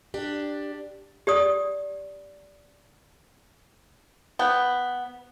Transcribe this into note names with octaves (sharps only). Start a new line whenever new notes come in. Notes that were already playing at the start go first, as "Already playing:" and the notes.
D4 G4
G4 D5 D#6
B3 G5